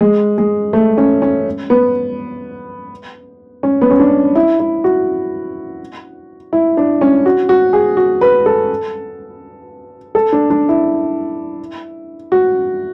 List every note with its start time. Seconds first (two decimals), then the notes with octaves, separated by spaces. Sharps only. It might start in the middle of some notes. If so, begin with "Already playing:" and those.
0.01 G#3
0.38 G#3
0.73 A3
0.98 C#4
1.22 C#4
1.70 B3
3.63 C#4
3.82 B3
3.91 C#4
3.99 D4
4.35 E4
4.60 E4
4.84 F#4
6.53 E4
6.77 D4
7.01 C#4
7.26 F#4
7.49 F#4
7.73 G#4
7.97 F#4
8.21 B4
8.46 A4
10.15 A4
10.32 D4
10.50 D4
10.69 E4
12.32 F#4